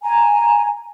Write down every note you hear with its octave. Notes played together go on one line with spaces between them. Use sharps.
G#5 A#5